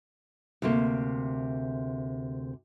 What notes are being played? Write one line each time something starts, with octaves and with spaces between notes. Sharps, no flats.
D2 C3 A#3